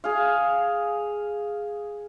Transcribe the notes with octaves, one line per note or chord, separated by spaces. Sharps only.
G#4 F5